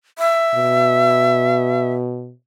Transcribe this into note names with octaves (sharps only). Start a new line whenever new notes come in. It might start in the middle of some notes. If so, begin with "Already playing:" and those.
E5
B2